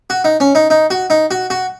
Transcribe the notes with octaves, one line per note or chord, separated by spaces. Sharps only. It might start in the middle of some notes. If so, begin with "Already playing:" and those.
F#4
D#4
C#4
D#4
D#4
F#4
D#4
F#4
F#4